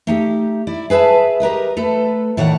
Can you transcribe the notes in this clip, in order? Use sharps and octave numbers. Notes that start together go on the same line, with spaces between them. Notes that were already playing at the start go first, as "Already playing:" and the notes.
A3 D#4 G4
E4 D5
G#4 B4 E5 A5
G4 A#4 B4 D#5
A3 A4 B4
A2 D#3 A3 C#5 D5 F#5